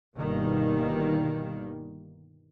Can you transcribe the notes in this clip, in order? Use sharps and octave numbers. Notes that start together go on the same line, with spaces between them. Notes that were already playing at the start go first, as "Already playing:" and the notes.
G1 B2 D#3 G3 A#3